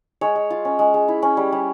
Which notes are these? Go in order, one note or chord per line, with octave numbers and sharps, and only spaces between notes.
G#3 C#5
G#3
F4
C#4
G#3
G#3
E4
C#4
G3
G3